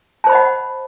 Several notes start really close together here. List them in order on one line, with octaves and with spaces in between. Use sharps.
A5 C5 B5 D#5 F#5